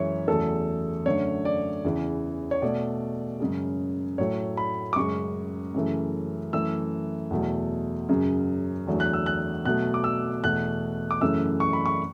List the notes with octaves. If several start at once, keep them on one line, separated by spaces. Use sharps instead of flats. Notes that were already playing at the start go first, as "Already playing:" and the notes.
Already playing: F#2 E3 G#3 C#5 E5
E2 C#3 F#3 A3 A4
F#2 D3 A3 C#5
D5
E2 C#3 E3
C#5
B2 A3 D5
F#2 C#3 G#3
A2 F#3 A3 C#5
B5
D6
F#2 C#3 G#3 C#6
F#2 C#3 E3 A3
F#2 E3 A3 E6
E2 B2 F#3 A3
F#2 C#3 F#3
E2 D3 F#3 A3
F#6
E6
F#6
B2 F#3 A3 F#6
D6
E6
E2 B2 A3 F#6
D6
F#2 C#3 E3 A3 E6
C#6
B5
C#6